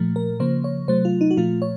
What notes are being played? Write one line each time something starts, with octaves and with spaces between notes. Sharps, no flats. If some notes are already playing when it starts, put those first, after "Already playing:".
Already playing: A#2 F3 A3
A#4
C#3 F3 A#3 C5
C#5
C3 F#3 A3 C5
F4
D#4
F#4
A#2 F3 A3 F4
C#5